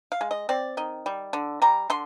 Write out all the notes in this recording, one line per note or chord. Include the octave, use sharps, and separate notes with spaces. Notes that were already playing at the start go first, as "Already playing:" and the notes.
F5
G#3
D#5
C4 D5
D#3 D#5
G3
D3
G3 A#5
D3 C6